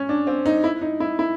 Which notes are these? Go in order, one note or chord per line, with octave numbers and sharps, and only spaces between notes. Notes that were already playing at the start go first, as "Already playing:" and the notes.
Already playing: C#4
D4
C4
D#4
E4
D#4
E4
E4